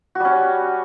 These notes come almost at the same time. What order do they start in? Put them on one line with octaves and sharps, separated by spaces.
F#4 G3 C#4